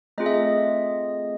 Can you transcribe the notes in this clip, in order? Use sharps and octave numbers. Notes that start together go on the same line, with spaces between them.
A3 C4 F4 G#4 D#5
E5
D#5